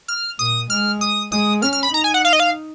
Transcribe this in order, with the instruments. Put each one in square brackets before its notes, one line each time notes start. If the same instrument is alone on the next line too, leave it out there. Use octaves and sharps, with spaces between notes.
[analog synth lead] F6
[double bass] A#2 [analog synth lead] D#6
[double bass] G#3 [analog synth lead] F6
[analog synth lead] D#6
[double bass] G#3 [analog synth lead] D#6
[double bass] C#4 [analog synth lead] F6
[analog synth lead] F6
B5
[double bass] D#4 [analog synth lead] A#5
[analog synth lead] G#5
F#5
F5
D#5
F5